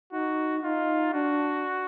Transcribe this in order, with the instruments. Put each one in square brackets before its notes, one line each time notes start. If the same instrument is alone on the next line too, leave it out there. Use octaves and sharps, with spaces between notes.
[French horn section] D#4 [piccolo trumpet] F#4
[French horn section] D#4 [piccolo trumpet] F4
[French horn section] D4 [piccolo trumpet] F#4